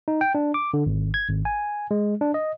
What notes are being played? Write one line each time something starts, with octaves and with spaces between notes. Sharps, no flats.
D#4
G5
D4
D6
D3
G#1
G#6
G#1
G#5
G#3
D4
D#5